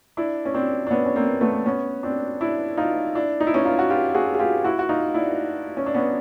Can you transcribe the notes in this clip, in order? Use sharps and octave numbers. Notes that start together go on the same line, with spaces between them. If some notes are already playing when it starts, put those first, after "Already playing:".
D4 E4
C#4
C4 D4
D4
B3 C#4
C#4
A#3 C4
A3 B3
B3 C#4
C4 D4
D4 E4
D#4 F4
D4 E4
D#4
E4
C#4 D#4
D#4 F4
F#4
F4 G4
F#4 G#4
G#4
F4 G4
E4 F#4
F#4
D#4 F4
D4 E4
C#4
D4
B3 C#4